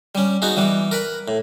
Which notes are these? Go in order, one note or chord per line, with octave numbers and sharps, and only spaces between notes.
G3 C#4
B3 D#4 F#4 G#4
E3 G3 B3
A#4 B4 B5
A2